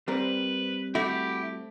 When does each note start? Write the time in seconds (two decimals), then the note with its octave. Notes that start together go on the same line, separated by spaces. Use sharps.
0.08 G3 C4 A#4 B4
0.95 A3 E4 F#4 G4